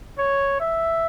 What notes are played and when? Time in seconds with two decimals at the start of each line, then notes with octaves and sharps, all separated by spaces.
0.18 C#5
0.60 E5